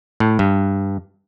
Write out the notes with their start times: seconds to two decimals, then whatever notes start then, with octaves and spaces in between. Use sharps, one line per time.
0.20 A2
0.39 G2